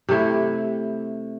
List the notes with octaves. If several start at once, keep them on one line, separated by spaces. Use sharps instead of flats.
C3 A3 E4